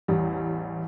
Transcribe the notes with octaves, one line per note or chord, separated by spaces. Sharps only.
A1 E2 G3